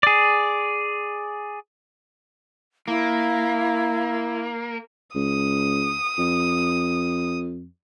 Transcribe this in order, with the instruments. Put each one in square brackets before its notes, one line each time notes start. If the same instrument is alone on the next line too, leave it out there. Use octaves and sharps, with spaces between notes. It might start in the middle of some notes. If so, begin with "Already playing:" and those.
[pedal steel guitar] G#4 D5
[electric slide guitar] A#3 [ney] E4
[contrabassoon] C#2 [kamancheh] D#6
[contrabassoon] F2